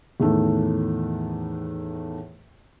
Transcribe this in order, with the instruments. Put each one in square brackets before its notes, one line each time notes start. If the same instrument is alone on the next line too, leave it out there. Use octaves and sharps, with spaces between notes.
[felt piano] E2 A2 D#3 A3